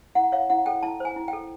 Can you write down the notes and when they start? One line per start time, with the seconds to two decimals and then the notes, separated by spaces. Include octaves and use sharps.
0.15 E4 F#5
0.32 C#5 F5
0.50 E4 F#5
0.66 A4 G5
0.83 E4 A5
1.00 C5 G#5
1.16 E4
1.28 G5
1.33 A4